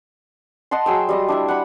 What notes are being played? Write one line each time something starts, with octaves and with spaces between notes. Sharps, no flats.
D#5 F#5 A5 C6
F#3 G#4 G5 E6
G3 D#5 D#6
D4 E4 E5
F#5 B5